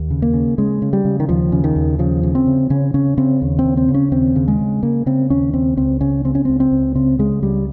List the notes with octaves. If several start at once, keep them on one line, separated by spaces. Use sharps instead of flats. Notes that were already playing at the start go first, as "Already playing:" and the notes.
Already playing: D#2
C#3
A#3
C#3
C#3 G#3
C#3
G3
C#3
D#3
D#2 F3
C#3
D#3
D#2
C#3 F3
C#3
C4
C#3
C#3 C#4
C#3 C#4
C#3 C4
D#2
C4
C#3
C4
C#3
C#4
D#2 C4
C#3
G#3
C#3
C#3 A#3
C#3 C4
D#2 C#4
C#3 C4
C#2 C4
C#3 C#4
C#3 C4
C#4
C#2 C4
C4
C#2
C#3 C4
C#3 G#3
C#2 G3